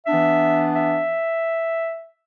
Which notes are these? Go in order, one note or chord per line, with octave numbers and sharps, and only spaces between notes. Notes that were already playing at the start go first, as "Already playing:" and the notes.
E3 B3 D4 E5
E5